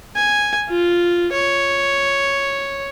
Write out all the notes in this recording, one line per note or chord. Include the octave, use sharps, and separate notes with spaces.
G#5
F4
C#5